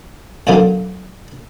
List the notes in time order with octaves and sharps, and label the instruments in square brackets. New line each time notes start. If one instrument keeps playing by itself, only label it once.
[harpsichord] A#2 D3 F#3 A#3 B3 F4